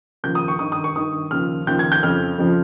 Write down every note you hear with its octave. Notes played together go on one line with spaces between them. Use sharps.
D#2 C#3 F3 G6
D#6
C#6
G2 D#3 D#6
D#6
C#6
G2 D#3 D#6
D#2 C#3 F3 F6
D#2 C#3 F3 G6
G#6
G6
F2 C#3 F3 F6
F2 C#3 F3